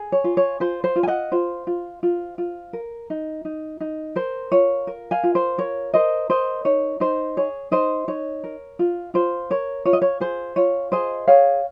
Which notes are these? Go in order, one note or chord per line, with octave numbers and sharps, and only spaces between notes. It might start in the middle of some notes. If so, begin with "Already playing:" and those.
Already playing: G#4
C#5
F4
C#5
F4 C5
C5
F4
G#5
D#5 F#5
F4 C5
F4
F4
F4
A#4
D#4
D#4
D#4
A#4 C5
F4 C#5
A#4
F5 G#5
F4
C5
A#4 C#5
A#4 C5 D#5
A#4 C5 D#5
D#4 C#5
D#4 C5
G#4 C#5
D#4 C5 D#5
D#4 C#5
A#4
F4
F4 C5
A#4 C#5
F4 C#5
D#5
C#5
G#4 C5
F4 C#5
G#4 C5 D#5
G#4 C#5 F5